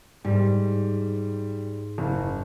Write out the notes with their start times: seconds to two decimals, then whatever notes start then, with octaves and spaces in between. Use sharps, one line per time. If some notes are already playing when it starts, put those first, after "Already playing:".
0.24 G#2 G3
1.98 F#1